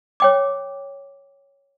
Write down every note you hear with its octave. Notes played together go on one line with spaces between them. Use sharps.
C#5 G5 D6